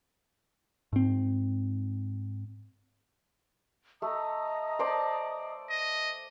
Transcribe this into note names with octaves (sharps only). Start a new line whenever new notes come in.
G#2 C4
A3 D#5 A#5 D#6
C5 D5 A5
D#5